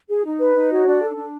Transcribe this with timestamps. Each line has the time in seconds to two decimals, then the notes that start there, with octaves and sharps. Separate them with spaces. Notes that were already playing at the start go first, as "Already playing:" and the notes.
0.09 G#4
0.25 D#4
0.40 B4
0.56 D#4
0.71 F#4 C#5
0.86 D4 D5
1.02 A4
1.18 D4